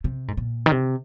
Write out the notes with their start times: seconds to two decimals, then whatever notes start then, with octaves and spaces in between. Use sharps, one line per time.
0.04 C3
0.28 G#2
0.37 A#2
0.66 D#3
0.72 C3